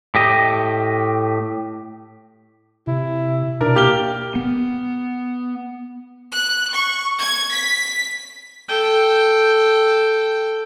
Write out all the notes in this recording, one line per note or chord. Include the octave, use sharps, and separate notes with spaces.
A2 G4 D#5
C3 E4
B2 D4 A#4
A#3 G4 F6 G7
B3
F#6
C#6
G#6
B6
A4 G5